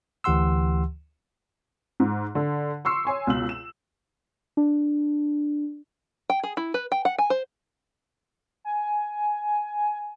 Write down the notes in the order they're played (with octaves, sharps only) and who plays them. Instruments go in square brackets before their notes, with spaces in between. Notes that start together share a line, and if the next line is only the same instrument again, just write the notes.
[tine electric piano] D2 E3 G4 F#5 C6 E6
[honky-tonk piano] G#2
D3
C6 C#6 E6 C7
C#5 G#5 C6
C#2 B2 E6 F#7
E7
[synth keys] D4
[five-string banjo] G5
G#4
E4
B4
G5
F#5
G#5
C5
[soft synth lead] G#5